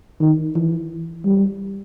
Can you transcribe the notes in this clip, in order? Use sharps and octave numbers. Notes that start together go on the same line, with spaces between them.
D#3
E3
G3